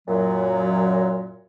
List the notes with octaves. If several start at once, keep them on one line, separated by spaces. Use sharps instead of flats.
F#2 A#2 F#3